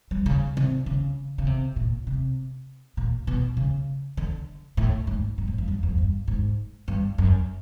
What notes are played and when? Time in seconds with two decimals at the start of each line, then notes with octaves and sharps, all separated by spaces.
0.11 G3
0.26 C#3
0.57 C3
0.86 C#3
1.38 C#3
1.47 C3
1.76 A#2
2.07 C3
2.97 A#2
3.27 B2
3.57 C#3
4.17 D3
4.77 A2
5.07 G#2
5.38 G#2
5.47 A2
5.58 G2
5.68 F#2
5.83 F2
5.98 G2
6.28 G#2
6.88 G2
7.18 F#2